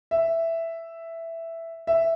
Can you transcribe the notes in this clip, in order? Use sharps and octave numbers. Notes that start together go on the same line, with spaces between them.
E5
E5